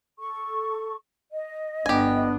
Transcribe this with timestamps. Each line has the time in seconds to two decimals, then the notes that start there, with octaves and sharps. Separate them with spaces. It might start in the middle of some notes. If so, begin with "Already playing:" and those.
0.19 A4 C#6
1.32 D#5
1.86 G1 B3 D4 G4 G#5